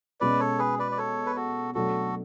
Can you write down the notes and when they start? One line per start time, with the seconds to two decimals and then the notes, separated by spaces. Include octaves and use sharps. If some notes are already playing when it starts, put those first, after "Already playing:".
0.20 B2 G#3 C#4 B4 D5
0.40 A4 C#5
0.59 G#4 B4
0.79 B4 D5
0.92 D5
0.98 A4 C#5
1.26 B4
1.36 F#4 A4
1.74 B2 F#3 A3 D4 F#4 A4